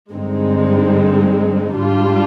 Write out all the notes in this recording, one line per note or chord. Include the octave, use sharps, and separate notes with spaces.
G2 D3 G#3 C4 D#4
G#2 G3 D4 F4